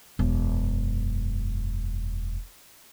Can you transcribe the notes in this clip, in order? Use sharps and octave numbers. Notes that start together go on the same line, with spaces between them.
E1 F#2